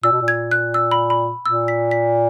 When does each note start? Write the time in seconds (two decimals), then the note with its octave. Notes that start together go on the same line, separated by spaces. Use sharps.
0.03 A#2 E6
0.13 B2
0.22 A#2
0.28 G#6
0.51 F#6
0.74 E6
0.91 B5
1.10 B5
1.44 A#2 E6
1.68 B6
1.91 B6